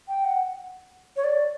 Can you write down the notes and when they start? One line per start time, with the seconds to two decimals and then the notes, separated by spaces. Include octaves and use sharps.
0.08 G5
0.25 F#5
1.16 C#5
1.24 D5